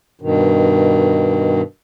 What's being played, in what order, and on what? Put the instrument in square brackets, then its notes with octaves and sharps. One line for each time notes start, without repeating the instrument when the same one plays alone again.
[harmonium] G2 B2 D#3